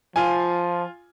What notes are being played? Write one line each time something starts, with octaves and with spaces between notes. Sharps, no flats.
F3 F4 G#5